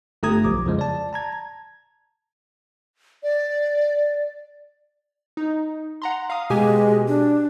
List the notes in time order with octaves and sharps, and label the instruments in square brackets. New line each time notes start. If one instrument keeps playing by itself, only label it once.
[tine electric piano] G1 A3 G4 A#5 D#6 G#6
B1 F3 D6
F2 C#3 F3 G#3
D5 A5
A5 A#5 G#6
[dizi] D5
[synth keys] D#4
F#5 A#5 C6
F5 A#5 D#6
[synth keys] B2 G4 G#5 [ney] G#3
[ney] D4